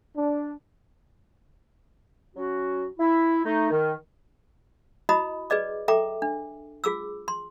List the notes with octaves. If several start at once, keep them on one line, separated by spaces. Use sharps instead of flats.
D4
F#3 C#4 F#4
E4
A3 D#4
D#3
E4 F#4 D#5 A#5 B5 D#6
G#4 B4 D5 D#5 D6
A4 E5 G5 A#5 D6
D4
F4 G#4 D6 E6
C6